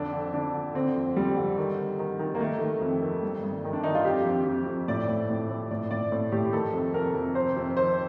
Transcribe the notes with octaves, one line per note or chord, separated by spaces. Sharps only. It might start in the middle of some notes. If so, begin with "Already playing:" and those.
Already playing: F2 D3 D4
D3
D3 D4
D3
D3 C4
F2
F2 G3
D3
D#3
D#3
D#3
D#3
A#3
D#3 A3
D#3
F2
D#3
G2
G2
D#3
D4
D#3 D#4
F4
F2 G4
F2
F2
F2
A2 D5
A2
A2
A2
A2 D5
A2 D5
A2
A2 G4
D#3 A4
F2
C3 A#4
F2
C3 C5
F2
D#3 C5